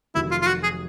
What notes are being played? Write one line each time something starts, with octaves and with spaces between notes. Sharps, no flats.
F1 F2 C3 D#3 F#3 E4
F4
F4
F#4
G#4